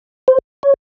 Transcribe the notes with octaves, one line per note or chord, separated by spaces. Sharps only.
C5
C#5